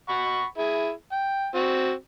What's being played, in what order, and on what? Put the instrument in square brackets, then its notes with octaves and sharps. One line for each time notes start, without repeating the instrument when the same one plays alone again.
[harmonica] F#5 B5 C#6
E4 G#4
G5
C4 F#4